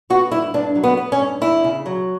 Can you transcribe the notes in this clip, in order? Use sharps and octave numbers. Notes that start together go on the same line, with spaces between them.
B3 F#4
G2 E4
G2 D4
F#3
B3
B3
C#4
G2
E2 E4
C#3
F#3